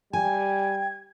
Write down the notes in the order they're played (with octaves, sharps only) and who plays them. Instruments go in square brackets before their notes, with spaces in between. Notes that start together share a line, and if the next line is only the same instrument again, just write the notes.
[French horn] G3 [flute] G5 [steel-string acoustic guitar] G#5 [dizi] G#6